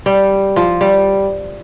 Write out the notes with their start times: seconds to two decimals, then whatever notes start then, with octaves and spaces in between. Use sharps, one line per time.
0.06 G3
0.56 F3
0.81 G3